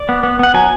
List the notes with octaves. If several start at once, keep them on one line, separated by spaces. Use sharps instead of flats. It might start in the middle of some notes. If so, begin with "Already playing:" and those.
Already playing: D5
B3
B3
B3 F#5
F#3 G#5